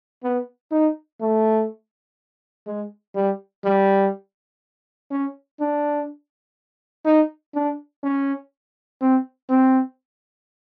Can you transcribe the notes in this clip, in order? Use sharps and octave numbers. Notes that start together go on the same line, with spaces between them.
B3
D#4
A3
G#3
G3
G3
C#4
D4
D#4
D4
C#4
C4
C4